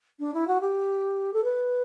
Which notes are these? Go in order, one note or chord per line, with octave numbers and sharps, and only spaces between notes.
D4
E4
F#4
G4
A4
B4